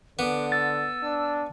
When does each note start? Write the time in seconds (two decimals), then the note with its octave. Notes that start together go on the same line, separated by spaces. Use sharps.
0.19 D3 B3 D6
0.52 E6 A6
1.03 D4